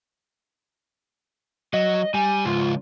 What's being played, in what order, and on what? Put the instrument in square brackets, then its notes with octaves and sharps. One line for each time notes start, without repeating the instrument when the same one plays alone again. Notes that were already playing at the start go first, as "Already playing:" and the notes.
[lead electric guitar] F#3 [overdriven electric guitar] D#5
[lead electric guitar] G3 [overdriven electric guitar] G#5
[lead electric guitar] C#2 G#2 [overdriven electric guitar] F4